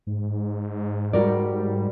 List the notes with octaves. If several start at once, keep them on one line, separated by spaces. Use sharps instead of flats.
G#2
G3 F#4 A#4 D5